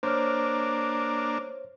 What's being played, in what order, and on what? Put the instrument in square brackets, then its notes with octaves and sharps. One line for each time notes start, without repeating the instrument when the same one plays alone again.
[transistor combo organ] A#3 D4 [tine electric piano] C5 C#5 F6